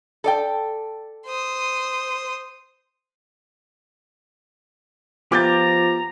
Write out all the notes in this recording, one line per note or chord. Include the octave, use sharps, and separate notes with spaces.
A4 D5 G5
C5 D#6
F3 B3 F4 G4 A#5 D6 G6 A6